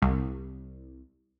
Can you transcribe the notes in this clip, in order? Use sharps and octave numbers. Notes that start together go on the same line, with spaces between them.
C2